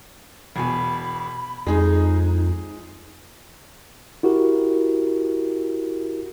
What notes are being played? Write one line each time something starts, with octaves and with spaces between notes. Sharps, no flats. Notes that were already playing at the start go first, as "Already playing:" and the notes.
E1 B2 G#5 B5
F2 G#3 D#4 G#4
E4 F#4 G4 A#4